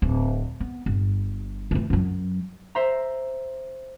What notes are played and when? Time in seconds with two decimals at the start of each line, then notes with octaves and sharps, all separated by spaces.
0.02 D1
0.60 B3
0.86 G1
1.71 E3 A3
1.90 F#2 F#3
2.75 C5 E5 A#5